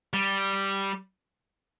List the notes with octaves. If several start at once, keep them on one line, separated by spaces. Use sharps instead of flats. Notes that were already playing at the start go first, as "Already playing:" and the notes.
G3